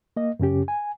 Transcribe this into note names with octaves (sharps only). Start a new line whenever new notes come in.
A#3 D#5
F#2 C#3 C#4 G4
G#5